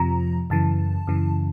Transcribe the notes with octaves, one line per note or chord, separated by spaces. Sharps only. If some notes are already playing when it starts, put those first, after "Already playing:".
Already playing: F2 C3 F3 A#5
F#2 C#3 E3 A5
F#2 C#3 E3